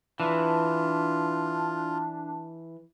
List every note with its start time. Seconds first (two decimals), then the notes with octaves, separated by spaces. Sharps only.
0.20 E3 D4 F4